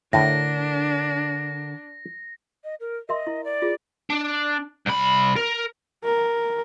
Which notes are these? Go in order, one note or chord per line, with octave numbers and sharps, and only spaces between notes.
A2 D3 D4 A#4 A#6
D#5
A#4
A#4 D#5 E5 C6
E4
D5
F4 G#4
D4
C2 B5
A#4
A#4